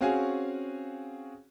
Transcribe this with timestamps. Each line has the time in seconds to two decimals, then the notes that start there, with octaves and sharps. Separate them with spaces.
0.01 C4 C#4 F#4 G#4 F5 G#5